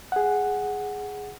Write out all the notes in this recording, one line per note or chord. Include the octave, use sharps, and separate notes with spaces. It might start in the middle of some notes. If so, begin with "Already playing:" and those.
G#4 F#5